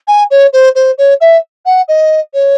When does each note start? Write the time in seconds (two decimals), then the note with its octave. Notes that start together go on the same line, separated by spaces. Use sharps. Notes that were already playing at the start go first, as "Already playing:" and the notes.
0.07 G#5
0.30 C#5
0.53 C5
0.75 C5
0.98 C#5
1.20 E5
1.65 F#5
1.88 D#5
2.33 C#5